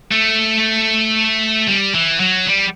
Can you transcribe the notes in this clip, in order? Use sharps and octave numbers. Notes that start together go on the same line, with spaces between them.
A3
G3
E3
F#3
G3